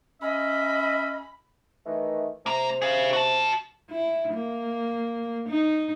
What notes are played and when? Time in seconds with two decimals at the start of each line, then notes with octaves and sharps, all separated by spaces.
0.22 C#4 D#5 E5 B5
1.85 D#3 E3 A3
2.46 C3 A#3 A#5
2.82 G#4 F5
3.13 F#4 A5
3.90 E4
4.34 A#3
5.49 D#4